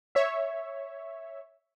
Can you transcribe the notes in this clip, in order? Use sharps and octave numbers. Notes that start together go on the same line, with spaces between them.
C#5 E5